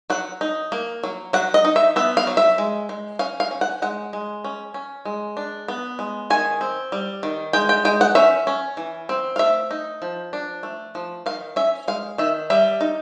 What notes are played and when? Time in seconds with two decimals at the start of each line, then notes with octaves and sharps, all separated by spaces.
0.10 F#3 F#5
0.41 D#4
0.72 A#3
1.03 F#3
1.33 F#3 F#5
1.54 D#5
1.65 D#4
1.76 E5
1.96 B3 E5
2.17 F5
2.27 F#3
2.37 E5
2.58 G#3
2.89 G#3
3.19 C#4 F5
3.40 F5
3.51 C#4
3.61 F#5
3.82 G#3 F#5
4.13 G#3
4.44 C#4
4.74 C#4
5.05 G#3
5.37 D4
5.68 B3
5.99 G#3
6.30 D#3 G#5
6.61 C4
6.92 G3
7.23 D#3
7.53 G#3 G5
7.69 G5
7.85 G#3 G5
8.01 F#5
8.15 C#4 E5
8.47 C#4
8.77 E3
9.09 C4
9.36 F5
9.39 A3 E5
9.71 D#4
10.02 F3
10.33 D4
10.63 A3
10.95 F3
11.26 D#3 F5
11.56 C#4 E5
11.88 G#3 F5
12.18 D#3 E5
12.50 G3 E5
12.81 D#4